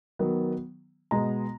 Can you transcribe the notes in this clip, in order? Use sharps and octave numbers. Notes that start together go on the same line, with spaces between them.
D#3 F#3 B3
B2 G#3 B3 A#5